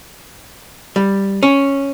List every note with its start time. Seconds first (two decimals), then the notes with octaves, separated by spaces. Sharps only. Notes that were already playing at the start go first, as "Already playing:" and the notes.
0.96 G3
1.43 C#4